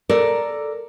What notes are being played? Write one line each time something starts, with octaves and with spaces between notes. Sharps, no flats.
A4 A#4 D5